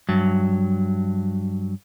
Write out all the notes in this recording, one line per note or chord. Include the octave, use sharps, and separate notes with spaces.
G2 F#3